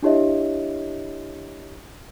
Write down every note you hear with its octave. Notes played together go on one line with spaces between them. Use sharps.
D4 E4 G4 C#5 D#5 E5